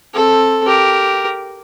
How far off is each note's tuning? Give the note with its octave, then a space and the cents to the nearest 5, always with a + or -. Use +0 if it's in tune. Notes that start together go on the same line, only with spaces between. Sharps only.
C4 +25 A4 +0
G4 -5 A#4 +0